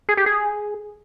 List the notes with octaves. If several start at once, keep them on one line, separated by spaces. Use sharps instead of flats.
G#4
G4
G#4